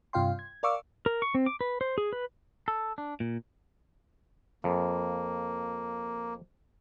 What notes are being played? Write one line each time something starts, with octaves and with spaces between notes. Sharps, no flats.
G2 C3 F4 F5 G5 C6
G#6
A#4 D5 F5 C#6 D6 E6
A#4
C#6
C4
D6
B4
C5
G#4
B4
A4
D4
A#2
F2 A#3